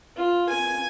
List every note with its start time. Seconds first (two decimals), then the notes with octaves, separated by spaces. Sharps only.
0.16 F4
0.49 G#5